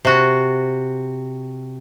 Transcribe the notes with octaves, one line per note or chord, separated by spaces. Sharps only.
C3 F#4